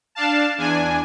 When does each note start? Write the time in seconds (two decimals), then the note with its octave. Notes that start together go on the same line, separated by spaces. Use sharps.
0.15 D4 F5 A5
0.58 E2 D4 G#5